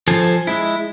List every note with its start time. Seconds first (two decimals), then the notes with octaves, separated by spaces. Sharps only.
0.08 F3 A4 C5 G#5
0.47 G#3 E4